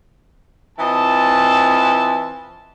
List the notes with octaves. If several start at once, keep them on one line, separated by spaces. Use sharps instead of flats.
E3 C4 F4 D#5 A5